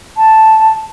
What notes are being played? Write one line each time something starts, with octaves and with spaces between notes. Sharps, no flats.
A5